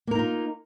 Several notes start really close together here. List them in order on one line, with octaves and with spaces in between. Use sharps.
A#3 A#4 D#4 F4